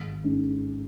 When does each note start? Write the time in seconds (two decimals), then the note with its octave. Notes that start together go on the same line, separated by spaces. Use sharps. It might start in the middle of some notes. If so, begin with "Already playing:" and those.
Already playing: G#1
0.24 G#2 D#3 G#3 C#4